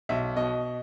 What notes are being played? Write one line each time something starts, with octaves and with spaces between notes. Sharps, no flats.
B1 E5
B2 D#5